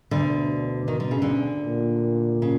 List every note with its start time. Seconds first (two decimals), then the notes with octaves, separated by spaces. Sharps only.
0.11 D2 B2 D3
0.88 D#3
1.00 D3
1.11 C#3
1.22 D2 D3
1.65 A#2
2.42 C#3